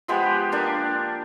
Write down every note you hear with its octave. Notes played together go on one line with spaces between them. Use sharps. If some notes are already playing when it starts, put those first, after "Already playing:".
F3 G#3 B3 G4
A#3 D4 D5